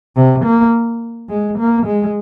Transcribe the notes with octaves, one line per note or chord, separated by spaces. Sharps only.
C3
A#3
G#3
A#3
G#3